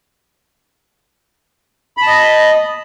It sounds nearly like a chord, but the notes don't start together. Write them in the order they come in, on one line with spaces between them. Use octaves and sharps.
B5 A5 D#5